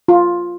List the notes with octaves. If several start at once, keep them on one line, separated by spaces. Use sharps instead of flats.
F4